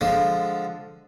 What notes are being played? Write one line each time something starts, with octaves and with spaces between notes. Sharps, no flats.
D3 F3 G#3